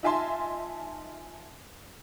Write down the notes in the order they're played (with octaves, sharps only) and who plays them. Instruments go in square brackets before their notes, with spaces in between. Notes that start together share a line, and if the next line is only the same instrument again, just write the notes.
[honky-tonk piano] D#4 F4 E5 G#5 A5 C6